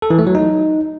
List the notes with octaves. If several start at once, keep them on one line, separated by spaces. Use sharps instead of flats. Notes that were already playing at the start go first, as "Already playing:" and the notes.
A4
E3
A3
F#3
D#4